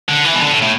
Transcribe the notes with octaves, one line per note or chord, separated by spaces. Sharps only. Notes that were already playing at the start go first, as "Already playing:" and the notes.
D3
E3
B2
D3
A2
A2